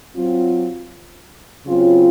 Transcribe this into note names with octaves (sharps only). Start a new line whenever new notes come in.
F#3 C4 F4
C#3 F#3 C4 F4